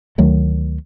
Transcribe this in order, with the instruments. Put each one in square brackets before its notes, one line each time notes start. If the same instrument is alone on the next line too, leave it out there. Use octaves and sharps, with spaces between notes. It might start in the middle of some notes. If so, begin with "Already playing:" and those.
[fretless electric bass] D2 D#3 F#3 A3